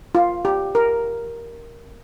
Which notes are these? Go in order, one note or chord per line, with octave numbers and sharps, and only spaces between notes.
F4
G4
A#4